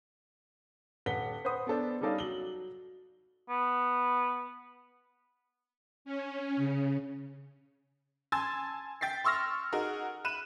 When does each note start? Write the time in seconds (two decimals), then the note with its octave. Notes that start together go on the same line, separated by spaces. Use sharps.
1.06 D#1 B4 F#5 B6 G7
1.45 B4 C5 F#5 B5 D#6
1.67 B3 D4 A4 C5
2.01 G3 C#4 D#4 A4 D5 F5
2.19 F#3 F#7 G7
3.50 B3
6.05 C#4
6.56 C#3
8.32 G#5 A5 C6 E6 G#6 A6
9.01 G5 A6 B6 C7
9.24 C6 C#6 E6 F6 A#6
9.73 D#4 F#4 G#4 A#4
10.25 B5 F#6 D#7 E7